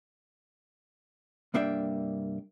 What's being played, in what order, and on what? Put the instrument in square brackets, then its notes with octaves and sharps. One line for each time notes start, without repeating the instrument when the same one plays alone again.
[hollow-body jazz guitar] C2 G2 A#3 D4 E5 G5